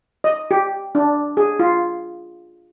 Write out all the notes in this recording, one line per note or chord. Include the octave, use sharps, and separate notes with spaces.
D#5
G4
D4
G#4
F4